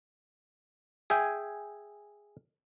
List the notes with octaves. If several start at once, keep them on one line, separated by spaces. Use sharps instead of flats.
G#4 E5 G5 G#5